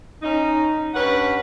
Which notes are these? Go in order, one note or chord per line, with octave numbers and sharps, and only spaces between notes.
C#4 D#4
G2 C#4 B4 F#5